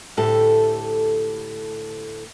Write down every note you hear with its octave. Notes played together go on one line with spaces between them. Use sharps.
D2 A2 G4 A4